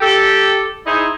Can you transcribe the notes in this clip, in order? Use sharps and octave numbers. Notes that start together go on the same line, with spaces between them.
G4 A4
D#4 E4 G#4 C5 D#5 E5